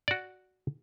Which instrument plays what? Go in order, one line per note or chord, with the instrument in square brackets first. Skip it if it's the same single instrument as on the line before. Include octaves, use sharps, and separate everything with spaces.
[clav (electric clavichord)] F#4 D5